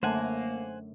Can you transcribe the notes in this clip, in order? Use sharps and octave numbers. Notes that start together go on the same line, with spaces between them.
F#2 D3 A3 A#3 C5 F#5 G#5